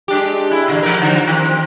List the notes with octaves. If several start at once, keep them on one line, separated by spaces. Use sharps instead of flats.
G#3 D4 G4
E4
A#2 D3 E3
F3 A#4
D3 F3
D#3 C4